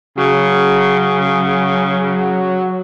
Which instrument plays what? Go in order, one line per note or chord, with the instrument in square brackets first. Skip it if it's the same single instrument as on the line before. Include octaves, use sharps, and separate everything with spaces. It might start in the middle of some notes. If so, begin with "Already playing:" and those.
[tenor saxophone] C#3 [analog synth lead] F#3